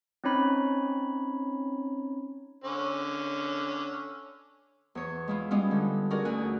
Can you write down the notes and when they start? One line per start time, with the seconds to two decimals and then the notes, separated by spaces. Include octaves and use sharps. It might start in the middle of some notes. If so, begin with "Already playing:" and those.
0.24 C4 C#4 D#4 C#5 B5
2.64 D3 C#4
4.95 E2 C#5
5.28 G#3 E4 F4
5.51 G3 G#3 B3 C#4 F4
5.71 D3
6.10 C#4 D#4 F#4 G#4 A#4 D5
6.25 D2 G#5 F#6